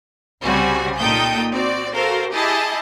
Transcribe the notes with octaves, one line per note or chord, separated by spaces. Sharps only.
C2 C#3 G3 C4 F#4 G#5
A#2 D#4 A4 G5 D#6 G6
C4 F#4 D5
F#4 A4 A#4 C5 F5
E4 G4 G#4 D#5 A5